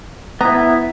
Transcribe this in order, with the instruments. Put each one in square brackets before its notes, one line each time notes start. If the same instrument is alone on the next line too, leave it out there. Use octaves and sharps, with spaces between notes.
[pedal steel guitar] B3 E4 [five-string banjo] A#5